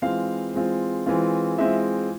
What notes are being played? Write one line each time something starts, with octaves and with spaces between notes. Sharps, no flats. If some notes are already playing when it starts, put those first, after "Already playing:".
E3 G#3 C4 F4 F5
E3 G#3 C4 F4
E3 G#3 C4 F4
E3 G#3 C4 F4 E5